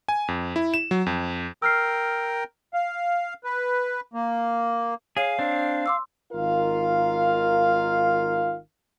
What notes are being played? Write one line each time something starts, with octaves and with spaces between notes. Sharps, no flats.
G#5
F2
E4
E7
F#3
F2
A#4 G5 E6 F6 C7
F5
B4
A#3
G#4 C#5 F5
C4 D4
C6 D6 E6
G#1 D#3 F4 A#4 F5